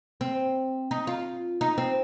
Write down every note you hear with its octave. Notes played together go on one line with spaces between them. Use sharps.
C4
D#4
F4
D#4
C4